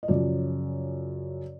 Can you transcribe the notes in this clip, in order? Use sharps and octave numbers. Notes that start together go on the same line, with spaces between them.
D#5
F#2 C#3 F3 D5